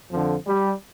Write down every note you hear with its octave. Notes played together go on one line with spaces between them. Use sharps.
F2 D3 F3
G3